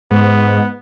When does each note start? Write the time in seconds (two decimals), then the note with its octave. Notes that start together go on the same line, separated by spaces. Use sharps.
0.11 G#2 B3